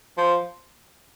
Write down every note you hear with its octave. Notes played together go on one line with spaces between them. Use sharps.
F3